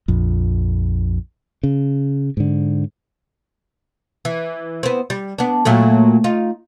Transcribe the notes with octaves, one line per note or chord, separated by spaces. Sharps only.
A#1 F2
C#3
G#2 D3
E3
B3 C4
G3
B3 D4
A#2 F#3 A3
D#4 F4